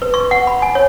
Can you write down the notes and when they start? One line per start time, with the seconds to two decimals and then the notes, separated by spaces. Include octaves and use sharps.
0.02 B4
0.14 C#6
0.31 F#5
0.47 B5
0.62 G#5
0.75 C#5